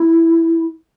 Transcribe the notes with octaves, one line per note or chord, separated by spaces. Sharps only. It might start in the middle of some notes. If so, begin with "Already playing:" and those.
Already playing: E4